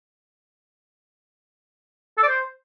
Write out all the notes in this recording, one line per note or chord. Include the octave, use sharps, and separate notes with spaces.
A4
D5
C5